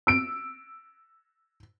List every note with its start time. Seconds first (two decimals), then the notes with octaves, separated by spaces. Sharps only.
0.07 E6 D7